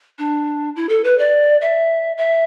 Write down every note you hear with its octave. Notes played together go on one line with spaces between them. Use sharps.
D4
E4
A4
B4
D5
E5
E5